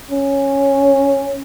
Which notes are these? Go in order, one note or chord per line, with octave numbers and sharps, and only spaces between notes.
C#4